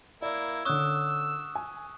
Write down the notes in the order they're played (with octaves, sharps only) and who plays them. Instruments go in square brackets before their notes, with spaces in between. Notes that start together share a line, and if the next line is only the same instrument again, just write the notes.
[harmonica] A#3 E4 [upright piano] D5
[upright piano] D3 C#4 [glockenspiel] C#6 D#6 F#6 [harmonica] E6
[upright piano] G#5